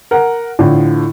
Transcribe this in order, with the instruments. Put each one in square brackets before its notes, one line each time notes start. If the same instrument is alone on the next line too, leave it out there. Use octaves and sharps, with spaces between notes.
[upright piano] A#4 F#5
A2 D3 F3